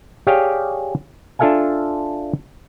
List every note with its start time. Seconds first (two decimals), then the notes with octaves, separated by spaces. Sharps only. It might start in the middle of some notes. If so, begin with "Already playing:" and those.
0.27 G4 G#4 C#5 D5 F5 G5
1.39 D4 F4 A4 E5 F5 G#5